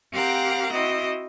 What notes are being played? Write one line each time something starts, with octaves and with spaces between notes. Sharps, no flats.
C4 G4 A#4 F5 F#5 A#5
C4 E4 F#4 D#5